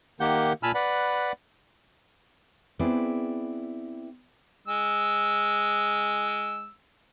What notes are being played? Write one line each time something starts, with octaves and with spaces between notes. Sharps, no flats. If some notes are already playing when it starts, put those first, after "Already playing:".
D#3 A#3 G4 F#5 G6
A#2 G#5 A5 B5 E6 F6
B4 D5 F#5 B5
B3 C4 E4 G#4 B4 D5
G#3 E6